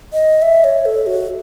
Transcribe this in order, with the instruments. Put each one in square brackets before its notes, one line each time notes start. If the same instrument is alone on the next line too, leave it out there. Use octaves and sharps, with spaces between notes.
[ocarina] D#5
E5
C#5
A4
F#4